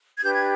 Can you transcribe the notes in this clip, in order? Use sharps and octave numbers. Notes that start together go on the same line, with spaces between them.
G#6
D4 G4 B4 G6
G#6